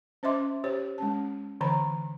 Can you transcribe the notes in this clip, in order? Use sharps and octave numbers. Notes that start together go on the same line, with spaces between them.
C#4 C5 D#5 E5 C6 D6
G4 C5 C#5
G#3 C#4 A5
D3 E3 A#5 B5